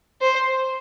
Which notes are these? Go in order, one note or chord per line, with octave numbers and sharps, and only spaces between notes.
C5